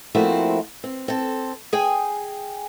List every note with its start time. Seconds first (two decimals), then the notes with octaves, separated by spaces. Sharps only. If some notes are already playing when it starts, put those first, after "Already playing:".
0.15 F3 A3 A#3 C4 E4 F#4
0.84 C4
1.08 C4 A4
1.73 G#4 G5 G#5